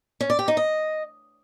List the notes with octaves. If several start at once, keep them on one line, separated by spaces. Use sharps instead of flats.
C#4
D5
G4
D#4
D#5